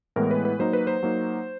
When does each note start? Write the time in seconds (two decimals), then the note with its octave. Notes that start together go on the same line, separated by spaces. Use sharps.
0.16 A2 E3 G#3 B3 A#4
0.31 B4
0.45 B4
0.59 F#3 A#3 D#4 C5
0.73 B4
0.87 C5
1.03 F#3 A#3 D#4